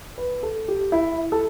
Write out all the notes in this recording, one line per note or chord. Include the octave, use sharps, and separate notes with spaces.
B4
A4
G4
E4
A4